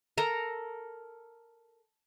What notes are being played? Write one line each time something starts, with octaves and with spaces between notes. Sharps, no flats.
A4 A#4 A#5